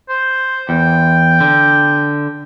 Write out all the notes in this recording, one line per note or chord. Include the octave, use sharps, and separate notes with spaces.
C5
E2 G5
D3